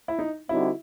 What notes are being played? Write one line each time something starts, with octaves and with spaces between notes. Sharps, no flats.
E4
D#4
D3 G3 C4 D#4 E4 F#4